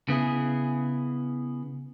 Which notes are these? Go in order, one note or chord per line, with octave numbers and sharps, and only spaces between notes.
C#3 B3 E4 G#4